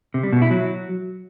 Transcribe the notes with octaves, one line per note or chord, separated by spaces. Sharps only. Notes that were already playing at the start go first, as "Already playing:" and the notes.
C3
G3
B2
E4
F#3